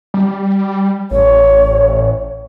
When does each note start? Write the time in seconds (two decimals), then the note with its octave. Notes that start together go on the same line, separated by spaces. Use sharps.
0.14 G3
1.11 A1 C#5